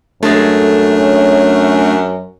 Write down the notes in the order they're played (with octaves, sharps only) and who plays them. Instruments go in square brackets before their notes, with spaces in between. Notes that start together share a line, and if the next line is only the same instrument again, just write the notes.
[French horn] F#2 [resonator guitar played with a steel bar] G#3 A4 [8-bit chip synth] A3 D4
[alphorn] C#4